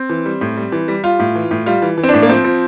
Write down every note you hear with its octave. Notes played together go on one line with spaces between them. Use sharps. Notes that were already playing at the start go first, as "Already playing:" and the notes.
Already playing: C4
E3
G3
A2
G3
E3
G3
G3 F4
A2
E3
A2
G3 F4
E3
E3
C4
A2 D4
A#3
F3 C4
F3